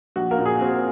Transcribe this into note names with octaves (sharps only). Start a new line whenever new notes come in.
A#1 F#4
A#3 A#4
A#2
G#4
C4 F#4